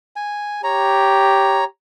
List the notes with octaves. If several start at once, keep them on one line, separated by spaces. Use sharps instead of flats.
G#5
G4 C#5 A#5